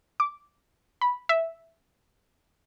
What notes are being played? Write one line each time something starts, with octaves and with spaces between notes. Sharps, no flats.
D6
B5
E5